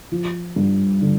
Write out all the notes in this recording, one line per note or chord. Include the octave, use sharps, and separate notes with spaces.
F3
G2
D3